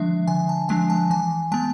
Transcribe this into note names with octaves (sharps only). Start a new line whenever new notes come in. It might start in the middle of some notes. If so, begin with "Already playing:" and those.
Already playing: D3 F3 G#3 D4 E5
D3 G#5
A5
F3 G#3 D4 G#5
A5
E3 G#5
G#3 B3 A5